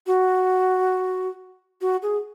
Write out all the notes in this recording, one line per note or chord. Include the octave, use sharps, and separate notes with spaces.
F#4
F#4
G#4